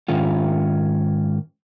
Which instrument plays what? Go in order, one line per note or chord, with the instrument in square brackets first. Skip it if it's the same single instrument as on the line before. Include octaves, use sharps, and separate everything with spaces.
[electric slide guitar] G#2 D#3 C#4 F4